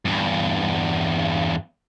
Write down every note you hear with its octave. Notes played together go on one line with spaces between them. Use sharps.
E2 G2